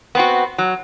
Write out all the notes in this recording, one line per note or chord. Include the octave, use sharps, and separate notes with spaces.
B3 C4 F#4
F#3